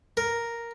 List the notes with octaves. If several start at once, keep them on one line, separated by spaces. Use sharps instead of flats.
A#4